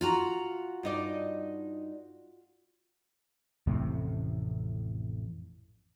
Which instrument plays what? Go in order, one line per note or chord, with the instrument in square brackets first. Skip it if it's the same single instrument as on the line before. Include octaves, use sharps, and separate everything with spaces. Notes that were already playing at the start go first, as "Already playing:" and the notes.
[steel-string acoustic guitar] F4 F#4 A#5
[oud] G2 D#4 D5
[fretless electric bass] A1 F2 A2 C3